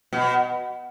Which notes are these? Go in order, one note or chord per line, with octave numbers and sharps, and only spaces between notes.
B2